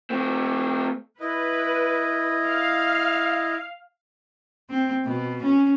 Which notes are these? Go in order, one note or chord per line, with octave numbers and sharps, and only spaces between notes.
A3 C4
E4 B4 D#5
F5
C4
B2
C#4